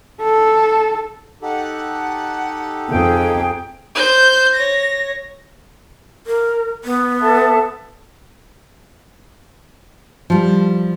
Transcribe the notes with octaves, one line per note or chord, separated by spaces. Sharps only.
A4
D#4 G4 A4 F#5
F2 G#4 G5
C5 G6
C#5 A#6
A#4
B3
A4 E5 A5
F3 G3